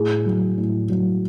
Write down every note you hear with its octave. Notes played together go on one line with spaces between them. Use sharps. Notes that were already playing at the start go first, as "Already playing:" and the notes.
Already playing: A2 G#4
F#3
A2
F#3